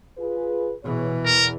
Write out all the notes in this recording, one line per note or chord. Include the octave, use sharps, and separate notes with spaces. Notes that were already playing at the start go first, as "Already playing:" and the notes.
F4 G#4 B4
B2 E3 B3 G#4 C#5
E2 A#4